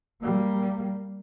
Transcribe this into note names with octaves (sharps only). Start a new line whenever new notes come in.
G3 A#3